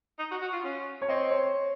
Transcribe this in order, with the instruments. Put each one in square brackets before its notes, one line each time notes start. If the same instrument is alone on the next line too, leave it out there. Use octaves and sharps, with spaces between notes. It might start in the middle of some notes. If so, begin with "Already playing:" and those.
[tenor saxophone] D#4
F#4
F#4
F4
C#4
[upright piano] C#5
[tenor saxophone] C4 [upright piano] D#5
[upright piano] C#5